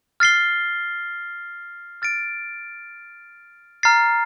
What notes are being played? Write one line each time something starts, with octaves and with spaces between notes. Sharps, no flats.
F6 A6 C7 G7
F6 A6 D7
A#5 F6 A6 C7